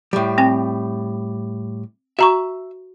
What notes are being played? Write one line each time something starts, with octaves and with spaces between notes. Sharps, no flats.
A2 G3
C4 G5
F#4 E5 A#5 C#6